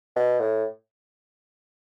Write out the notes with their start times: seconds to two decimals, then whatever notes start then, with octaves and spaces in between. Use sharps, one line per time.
0.16 B2
0.40 A2